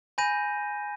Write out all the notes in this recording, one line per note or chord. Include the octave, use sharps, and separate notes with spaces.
G#5 B5 G6 A#6 D#7